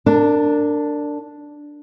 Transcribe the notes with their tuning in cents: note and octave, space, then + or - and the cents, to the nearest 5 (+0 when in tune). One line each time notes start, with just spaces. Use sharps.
D4 +0 A#4 -35